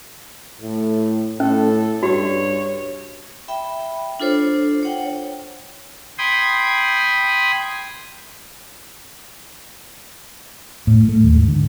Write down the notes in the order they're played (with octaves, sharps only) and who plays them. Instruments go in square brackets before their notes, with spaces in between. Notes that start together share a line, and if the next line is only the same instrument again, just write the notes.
[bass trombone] A2 [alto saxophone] A3
[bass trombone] A2 [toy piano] C#4 [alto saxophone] A4
[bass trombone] G2 [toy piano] F#4 G4 [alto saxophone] C#5
[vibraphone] E5 G5 B5
D4 F4 A4 C5 C#5
C#5 F#5 G5
[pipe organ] G5 B5 C6 D#6 G#6
[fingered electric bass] A2
A3
D#2
G#2
D3